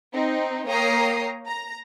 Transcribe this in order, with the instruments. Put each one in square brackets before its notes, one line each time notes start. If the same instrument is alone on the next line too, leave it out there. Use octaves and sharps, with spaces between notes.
[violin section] C4 D#4
A#3 C#5 G5 A#5 D#6 C7
A#5